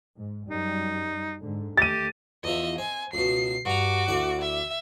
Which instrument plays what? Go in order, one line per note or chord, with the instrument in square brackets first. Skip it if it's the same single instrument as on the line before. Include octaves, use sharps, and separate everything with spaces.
[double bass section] G#2
[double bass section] F#2 G3 [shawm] D#4
[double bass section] G#2 D3
[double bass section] D#2 A3 [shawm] G4 [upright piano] A6 D#7
[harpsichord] E2 F3 [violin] D#5 E5
[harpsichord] C4 [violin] G#5
[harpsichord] C#2 B2 [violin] C7
[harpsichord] G2 A#5 [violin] F#4 D6
[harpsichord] D2 E4 D5
[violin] E5